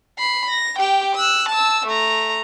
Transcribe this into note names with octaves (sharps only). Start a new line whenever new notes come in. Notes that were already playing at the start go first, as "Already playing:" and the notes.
B5 C7
A#6
G4 G5
E6 F#6
A5 E6
A3 A#5